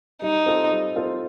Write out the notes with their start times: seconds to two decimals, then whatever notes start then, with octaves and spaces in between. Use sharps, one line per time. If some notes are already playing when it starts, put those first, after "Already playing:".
0.22 G3 D#4
0.46 C4 F4 A4
0.71 G3
0.96 C4 F4 A4